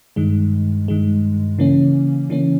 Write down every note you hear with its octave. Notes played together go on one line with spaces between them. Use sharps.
G2 D#3 G#3
G2 D#3 G#3
C#3 E3 A#3 C#4
C#3 E3 A#3 C#4